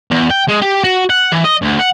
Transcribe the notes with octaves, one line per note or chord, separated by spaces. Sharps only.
E2
G5
G#3
G4
F#4
F#5
E3
D#5
D2
F#5